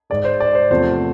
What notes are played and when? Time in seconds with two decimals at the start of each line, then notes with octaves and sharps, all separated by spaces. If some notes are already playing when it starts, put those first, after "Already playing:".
0.10 G#2 G#3 D5
0.25 C5
0.40 D5
0.55 C5
0.70 E2 C3 F3 A3 C5